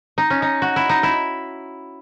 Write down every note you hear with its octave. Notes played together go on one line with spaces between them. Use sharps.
D#4
C#4
D#4
F#4
E4
D#4
E4